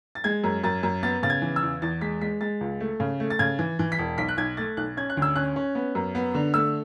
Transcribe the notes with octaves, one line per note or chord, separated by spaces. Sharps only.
A6
G#3 G#6
F#2
F#2 A6
F#2
B3 A6
C#3 A6
G#6
E3
E6
E2
E2 A6
G#3 B6
G#3 B6
G#3 A6
C#2
A3
C#3
A3
A6
C#3 G#6
E3
E3
B6
E1
B1 B6
F#6
B1 G#6
A3 A6
B1 F#6
C#4 G#6
F#6
D2
E6
C#4 F#6
C#4
B3
F#2
B3
D3
A3 E6